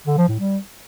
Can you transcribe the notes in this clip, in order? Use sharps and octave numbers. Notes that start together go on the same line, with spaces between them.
D3
F3
A2
G3